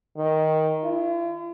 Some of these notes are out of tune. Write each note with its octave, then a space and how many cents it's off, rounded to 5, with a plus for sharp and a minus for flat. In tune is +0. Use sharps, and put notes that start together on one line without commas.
D#3 +10
F4 -45